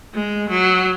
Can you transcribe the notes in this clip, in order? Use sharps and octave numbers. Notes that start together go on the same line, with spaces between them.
G#3
F#3